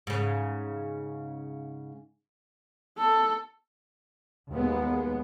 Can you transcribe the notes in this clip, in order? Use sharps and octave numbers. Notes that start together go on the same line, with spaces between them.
G#2 C#3
A4
D#2 G#3 B3